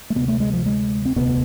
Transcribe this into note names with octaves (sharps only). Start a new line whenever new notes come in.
A3
D2 C3 B3
A3
G#3
F3
G#3
C4
E1 D2 C3 B3